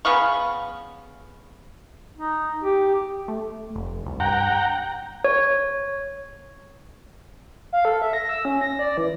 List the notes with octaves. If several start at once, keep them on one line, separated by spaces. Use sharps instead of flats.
C#3 B3 F5 C#6
D#4
G4
A3
F1
C2
G2 F#5 G5 A#5
C#5
F5
A4
E5
A#6
E6
C#4
A#6
D5
E3